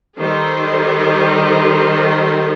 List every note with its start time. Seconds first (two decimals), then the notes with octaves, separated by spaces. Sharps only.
0.17 D#3 G3 D#4 A4 C5